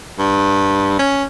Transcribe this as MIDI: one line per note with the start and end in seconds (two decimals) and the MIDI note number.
0.19 0.96 43
0.99 1.24 61